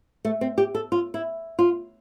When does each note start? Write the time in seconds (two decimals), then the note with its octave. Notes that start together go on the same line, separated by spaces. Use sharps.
0.25 A3
0.41 C4
0.58 G4
0.75 A4
0.92 F4
1.14 E4
1.59 F4